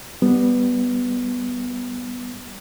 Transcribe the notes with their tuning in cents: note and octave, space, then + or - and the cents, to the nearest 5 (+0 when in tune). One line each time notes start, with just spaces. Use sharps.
G3 +0 B3 +0